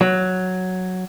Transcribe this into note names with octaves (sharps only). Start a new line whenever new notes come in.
F#3